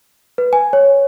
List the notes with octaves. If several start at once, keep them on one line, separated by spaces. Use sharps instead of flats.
B4
G#5
C#5